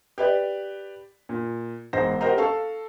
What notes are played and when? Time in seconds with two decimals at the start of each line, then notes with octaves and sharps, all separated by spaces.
0.18 G4 B4 D5
1.29 A#2
1.93 E1 G#2 C5 A#6
2.21 F#4 G4 A#4 C5 D#5 A#5
2.38 A4 F5 A5 C#6